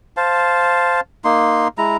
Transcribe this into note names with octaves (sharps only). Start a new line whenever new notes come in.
C5 F5 A5
A#3 D#4 C6
G#3 E4 A#5